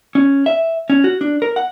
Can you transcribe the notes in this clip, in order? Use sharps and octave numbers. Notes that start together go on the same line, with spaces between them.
C#4
E5
C#4
F#4
D4
A#4
F#5